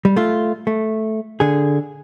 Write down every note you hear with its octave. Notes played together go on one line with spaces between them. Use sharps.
G3
A3 F4
A3
D3 G#4